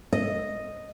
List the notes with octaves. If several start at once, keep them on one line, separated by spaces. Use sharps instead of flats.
D#5